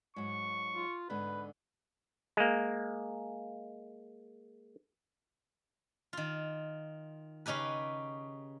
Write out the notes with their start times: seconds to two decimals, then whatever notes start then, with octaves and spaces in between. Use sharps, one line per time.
0.16 G#2 F#3 C#6
0.76 F4
1.10 G#2 D3 B3 B4
2.37 G#3 A#3
6.13 D#3 F4
7.46 C#3 C#4 D#4 G4 B4